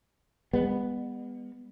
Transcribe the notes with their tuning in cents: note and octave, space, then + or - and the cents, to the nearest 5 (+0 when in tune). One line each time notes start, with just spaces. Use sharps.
G#3 -45 B3 +0